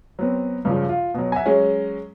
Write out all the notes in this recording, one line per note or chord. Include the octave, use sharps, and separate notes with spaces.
F#3 B3 C4
G2 C#3 F3
F4
B2 F#3
E5 F#5 G#5
F#3 G#3 C#4